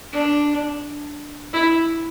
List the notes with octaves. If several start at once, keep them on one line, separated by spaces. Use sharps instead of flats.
D4
E4